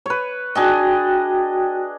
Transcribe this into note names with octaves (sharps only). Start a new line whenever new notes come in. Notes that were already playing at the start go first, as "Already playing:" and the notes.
B4 C#5
D4 F#4 G#4 D#5 G5